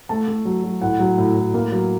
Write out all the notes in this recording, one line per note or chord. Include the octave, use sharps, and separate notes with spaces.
A3 A5
A3
F#3
F#3
A2 F#5
F#3
A2
A2
A#3
F#3